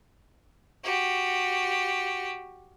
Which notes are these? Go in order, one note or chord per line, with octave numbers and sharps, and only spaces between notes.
F#4 G4